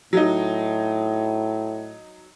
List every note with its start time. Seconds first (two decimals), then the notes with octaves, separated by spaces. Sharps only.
0.13 A2 F#3 D#4